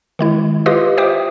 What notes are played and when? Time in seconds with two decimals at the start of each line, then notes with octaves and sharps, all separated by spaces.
0.19 D#3 G#3 E4
0.66 F4 G4 B4 D#5 F5 D#6
0.97 C5 E5 G5 D6 D#6